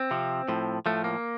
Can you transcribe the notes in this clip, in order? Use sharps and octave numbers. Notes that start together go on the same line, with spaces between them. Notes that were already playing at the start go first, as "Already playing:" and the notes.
Already playing: C4
C3 F3
A2 F3
A2 F3 A3
A#3